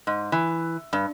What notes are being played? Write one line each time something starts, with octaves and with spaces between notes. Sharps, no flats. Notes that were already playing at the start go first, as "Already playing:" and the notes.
G#2
E3
G2